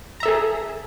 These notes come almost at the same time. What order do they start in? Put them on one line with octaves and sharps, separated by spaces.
A#5 E5 A4 G#4